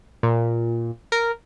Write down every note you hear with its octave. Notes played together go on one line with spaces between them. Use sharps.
A#2
A#4